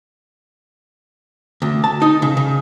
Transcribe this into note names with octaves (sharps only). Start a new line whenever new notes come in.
D2
A5
D#4
C#3
C#3